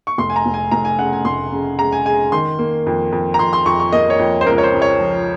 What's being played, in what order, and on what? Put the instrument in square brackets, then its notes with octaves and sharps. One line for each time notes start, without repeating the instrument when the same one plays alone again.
[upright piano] C#6
F1 C6
G#5
A#5
F1
G#5
F1 A#5
G#5
C#3 F#5
G#5
F1 C6
C#3
G#3 A#5
G#5
G#3 G#5
D#3 C6
A#3
F2
F2
A#5
F2 C6
C6
F2 C#6
C#6
A#3 D#5
C#5
F2
C5
C#2 A#4
C#5
C5
C#2
C#5
F3